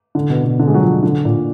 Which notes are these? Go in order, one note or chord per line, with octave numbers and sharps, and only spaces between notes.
D3
B2
B2
D3
G#3
F#3
F3
D3
A#2